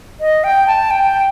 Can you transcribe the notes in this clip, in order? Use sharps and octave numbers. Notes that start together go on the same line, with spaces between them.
D#5
G5
A5
G5